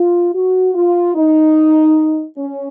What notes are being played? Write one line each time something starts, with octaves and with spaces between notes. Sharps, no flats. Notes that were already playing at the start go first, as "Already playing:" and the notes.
Already playing: F4
F#4
F4
D#4
C#4